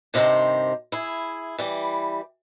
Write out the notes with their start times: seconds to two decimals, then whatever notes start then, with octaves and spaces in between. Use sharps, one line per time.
0.14 G2 C3 D#3 F4 G4 C5
0.92 E4 G#4
1.59 E3 G3